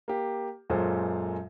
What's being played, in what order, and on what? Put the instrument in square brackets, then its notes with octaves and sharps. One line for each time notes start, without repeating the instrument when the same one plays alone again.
[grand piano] A#3 G4
F#2 A#2 G#3 A4 C5